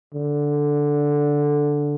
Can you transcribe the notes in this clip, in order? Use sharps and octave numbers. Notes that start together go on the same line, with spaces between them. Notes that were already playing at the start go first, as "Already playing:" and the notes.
D3